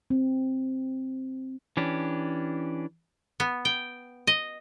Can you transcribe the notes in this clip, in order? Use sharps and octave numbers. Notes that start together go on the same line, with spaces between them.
C4
E3 C#4 D4 G4
B3
G5
D#5